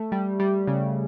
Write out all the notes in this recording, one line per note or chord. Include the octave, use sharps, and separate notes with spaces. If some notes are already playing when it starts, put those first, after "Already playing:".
Already playing: A3
G3
G3
C#3